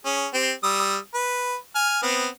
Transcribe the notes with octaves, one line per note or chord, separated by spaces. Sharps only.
C#4 G#4
C4 G4
G3 D#6 E6
B4
G#5 F6
B3 C4